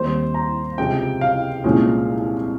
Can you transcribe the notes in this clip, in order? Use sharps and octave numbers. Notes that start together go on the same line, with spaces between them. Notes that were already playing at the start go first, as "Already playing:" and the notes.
Already playing: D#2 D#3 G3 C4 C5
A#5
C#2 C3 F3 G5
F5
C2 A#2 F3 G#3 C#4